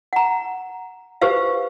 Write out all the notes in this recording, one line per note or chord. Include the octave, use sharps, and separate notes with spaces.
F#5 A#5
G4 B4 C5 F5